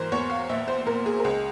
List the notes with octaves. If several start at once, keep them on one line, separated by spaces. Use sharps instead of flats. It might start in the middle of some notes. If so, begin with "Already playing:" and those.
Already playing: G#1 E3 A#4 C5
E2 C#5
F5
A#1 E5
C5
A#2 A#4
G#4
A#4
C#2 G#4